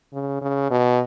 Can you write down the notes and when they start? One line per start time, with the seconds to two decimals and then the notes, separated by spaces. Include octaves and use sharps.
0.13 C#3
0.42 C#3
0.70 B2